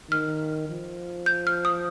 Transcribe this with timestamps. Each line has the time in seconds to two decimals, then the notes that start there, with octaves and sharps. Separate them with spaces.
0.11 D#3 F6
0.69 F3
1.26 G6
1.47 F6
1.65 D#6